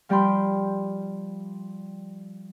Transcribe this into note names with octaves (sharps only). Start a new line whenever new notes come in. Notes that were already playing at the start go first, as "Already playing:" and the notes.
F3 G3 G4 G5 B5 C6